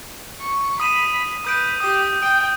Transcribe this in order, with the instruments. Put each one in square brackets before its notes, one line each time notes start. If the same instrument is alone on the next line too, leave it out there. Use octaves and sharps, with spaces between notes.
[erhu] C#6
[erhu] B5 [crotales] D#6 D#7 E7
[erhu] B4 [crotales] D#6 G6 D7
[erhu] G4 [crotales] D#6
[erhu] G5 [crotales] D#6 D7